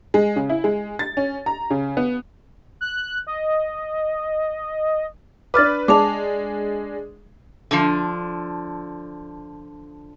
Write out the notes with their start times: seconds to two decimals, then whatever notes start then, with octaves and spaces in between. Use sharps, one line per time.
0.14 G#3
0.36 C#3
0.49 E4
0.64 G#3
0.99 A6
1.17 C#4
1.46 A#5
1.70 C#3
1.97 B3
2.81 F#6
3.27 D#5
5.54 D4 B4 D6 F6 A6
5.88 G#3 D4 A5 D6 F7
7.71 D3 F3